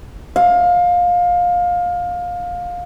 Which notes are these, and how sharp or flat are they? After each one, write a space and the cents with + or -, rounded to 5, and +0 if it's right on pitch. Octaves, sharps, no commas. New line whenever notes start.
F5 +20